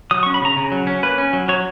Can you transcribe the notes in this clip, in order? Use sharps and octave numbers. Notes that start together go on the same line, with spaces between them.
F#3 D#6
C#6
C#4
B5
C#3 A#5
C#3
F#3
C#4
A#3 B4
C#4
F#3
F#3 C#5